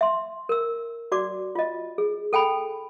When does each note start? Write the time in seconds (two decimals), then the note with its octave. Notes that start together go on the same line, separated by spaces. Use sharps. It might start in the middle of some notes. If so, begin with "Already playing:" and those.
0.01 E5 C6
0.49 A#4 E6
1.12 F#4 D5 D6
1.55 F4 D#5
1.98 G#4
2.33 A4 G5 G#5 B5